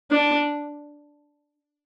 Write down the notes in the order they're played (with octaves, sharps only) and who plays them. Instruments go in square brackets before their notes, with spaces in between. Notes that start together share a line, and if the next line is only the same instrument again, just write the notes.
[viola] D4